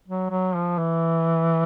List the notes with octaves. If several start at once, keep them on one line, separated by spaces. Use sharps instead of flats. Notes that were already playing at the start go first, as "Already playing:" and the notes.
F#3
F#3
F3
E3